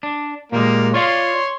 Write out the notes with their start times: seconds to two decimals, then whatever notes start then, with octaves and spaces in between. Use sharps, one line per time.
0.03 D4
0.52 A#2 G3 G#3 A#3
0.94 F4 C#5 D5 F5 C6